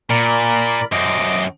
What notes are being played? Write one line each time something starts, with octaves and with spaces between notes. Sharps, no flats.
A#2 A#4 D5 B5
F#2 C4 D#5 D6